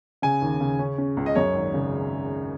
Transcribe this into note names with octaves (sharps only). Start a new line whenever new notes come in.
C#3 G#5
D#2
C#3
C#4
C#4
C#2
D#5
F#2 C#5
G#1
C#3